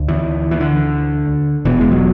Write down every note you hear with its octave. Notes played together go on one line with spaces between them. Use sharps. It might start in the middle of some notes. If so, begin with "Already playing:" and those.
Already playing: D2
E3
E3
D3
E1 E2 B2 E3
G#3
F#3